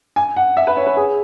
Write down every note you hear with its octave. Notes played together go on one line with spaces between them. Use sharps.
G#5
F#5
E5
B4
C#5
B4
G#4